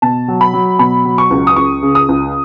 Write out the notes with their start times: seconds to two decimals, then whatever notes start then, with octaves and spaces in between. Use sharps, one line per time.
0.02 B2 A5
0.28 F#3
0.41 B5
0.53 F#3
0.79 B2 B5
1.05 F#3
1.18 C#6
1.31 C#2
1.47 D#6
1.56 C#2 C#6
1.83 C#3
1.95 D#6
2.09 C#2